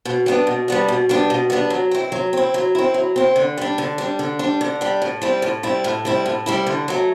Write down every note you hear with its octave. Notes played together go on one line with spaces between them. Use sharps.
B2
G3 B3 D4
B2
G3 B3 D4
B2
G3 B3 D4
B2
G3 B3 D4
F#3
C4 E4
F#3
C4 E4
F#3
C4 E4
F#3
C4 E4
D3
G3 D4
D3
G3 D4
D3
G3 D4
D3
G3 D4
A2
G3 C4 E4
A2
G3 C4 E4
A2
G3 C4 E4
A2
G3 C4 E4
D3
F#3 A3